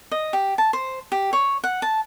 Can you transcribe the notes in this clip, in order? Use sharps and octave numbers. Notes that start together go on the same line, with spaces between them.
D#5
G4
A5
C5
G4
C#5
F#5
A5